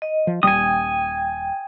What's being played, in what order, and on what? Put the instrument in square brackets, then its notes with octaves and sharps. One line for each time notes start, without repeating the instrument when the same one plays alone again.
[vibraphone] D#5
[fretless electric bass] F3
[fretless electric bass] D#1 G3 [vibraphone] G5 [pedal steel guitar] G#5 D#6